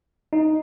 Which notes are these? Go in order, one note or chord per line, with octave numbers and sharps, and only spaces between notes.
D#4